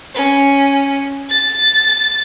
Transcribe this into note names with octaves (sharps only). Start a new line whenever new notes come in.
C#4
A6